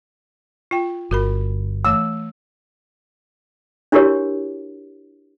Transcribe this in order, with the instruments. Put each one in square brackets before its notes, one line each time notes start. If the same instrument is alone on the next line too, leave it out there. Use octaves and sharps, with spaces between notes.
[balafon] F4 G5
[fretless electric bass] G1 [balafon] F#4 A#4 B5
[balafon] E3 A3 [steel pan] E6
[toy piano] D4 E4 F#4 G4 A#4 C#5